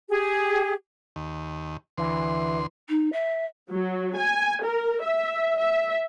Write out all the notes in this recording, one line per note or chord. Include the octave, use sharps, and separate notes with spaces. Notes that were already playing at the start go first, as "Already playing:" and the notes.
G4 G#4
D#2
D2 E3 C6
D#4
E5
F#3
G#5
A#4
E5
E5